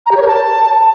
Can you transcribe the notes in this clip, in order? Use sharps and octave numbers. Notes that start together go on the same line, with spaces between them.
A#5
G4
C#5
A#4
A5